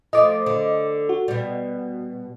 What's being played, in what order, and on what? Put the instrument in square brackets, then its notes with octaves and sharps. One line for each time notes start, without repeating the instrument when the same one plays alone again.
[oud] F3 A3 [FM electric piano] D#5 D6
[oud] D3
[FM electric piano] F#4
[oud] B2 G3